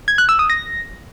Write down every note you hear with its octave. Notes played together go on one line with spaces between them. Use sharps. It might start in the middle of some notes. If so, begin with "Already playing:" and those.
G#6
F#6
E6
D#6
A#6